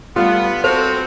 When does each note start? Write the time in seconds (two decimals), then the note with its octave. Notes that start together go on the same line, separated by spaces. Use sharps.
0.16 G3 A3 B3 F4
0.64 C4 F#4 A4 C5